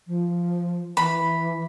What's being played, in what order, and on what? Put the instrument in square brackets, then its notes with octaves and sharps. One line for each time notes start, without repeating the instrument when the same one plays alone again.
[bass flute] F3
[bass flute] E3 [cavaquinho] B5